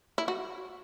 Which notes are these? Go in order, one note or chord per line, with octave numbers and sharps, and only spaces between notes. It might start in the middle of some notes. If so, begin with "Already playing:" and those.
E4
F#4